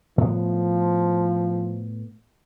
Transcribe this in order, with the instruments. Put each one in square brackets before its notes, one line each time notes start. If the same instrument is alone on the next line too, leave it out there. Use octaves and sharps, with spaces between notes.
[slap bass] A2 B3 [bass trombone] F3